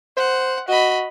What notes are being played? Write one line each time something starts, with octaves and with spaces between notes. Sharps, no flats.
C5 F#5
F#4 D#5 B5